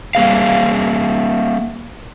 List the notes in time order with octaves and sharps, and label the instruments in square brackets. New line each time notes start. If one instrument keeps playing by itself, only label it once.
[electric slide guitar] G3 A#3 G#4 F5